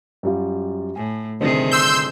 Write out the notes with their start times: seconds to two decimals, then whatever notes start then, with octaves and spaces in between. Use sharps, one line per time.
0.23 F#2 G3 F4
0.96 A2 G#5
1.40 G1 C3 D#3 C4 D4 G#4
1.71 C6 E6 G6